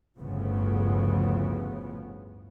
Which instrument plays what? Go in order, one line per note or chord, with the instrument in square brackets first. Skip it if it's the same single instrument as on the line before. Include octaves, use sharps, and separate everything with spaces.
[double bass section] G1 D2 A2 C#3 F3 B3